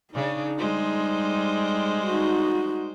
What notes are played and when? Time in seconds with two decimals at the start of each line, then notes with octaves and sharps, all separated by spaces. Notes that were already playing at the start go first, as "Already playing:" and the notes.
0.14 C#3 D4 D#4
0.58 G3 G#3 C5
2.07 D#4 F#4